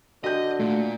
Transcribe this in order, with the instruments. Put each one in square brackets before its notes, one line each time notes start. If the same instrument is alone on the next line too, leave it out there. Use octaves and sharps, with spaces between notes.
[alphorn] D3 [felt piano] F#4 G6 [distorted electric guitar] D#5
[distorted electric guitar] A#2 [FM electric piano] A3